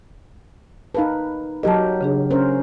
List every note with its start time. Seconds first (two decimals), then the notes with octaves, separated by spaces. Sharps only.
0.95 D#4 A#4 B4 F5 A5
1.63 F#3 G4 A#4 D#5 A5
2.01 C#3 D4 G#4
2.31 C#4 A#4 C5